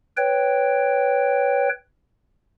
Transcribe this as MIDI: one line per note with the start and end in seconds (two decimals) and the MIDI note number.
0.17 1.69 71
0.17 1.69 73
0.17 1.69 79